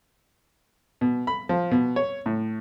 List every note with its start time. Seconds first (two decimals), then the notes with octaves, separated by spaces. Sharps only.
1.01 B2
1.27 B5
1.49 F3
1.71 B2
1.96 C#5
2.26 A2